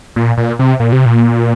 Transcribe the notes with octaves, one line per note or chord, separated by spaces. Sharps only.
A#2
A#2
C3
A#2
C3
A#2